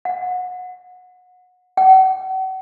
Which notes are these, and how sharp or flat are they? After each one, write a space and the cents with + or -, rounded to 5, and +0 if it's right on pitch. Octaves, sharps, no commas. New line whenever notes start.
F#5 -25
F#5 +40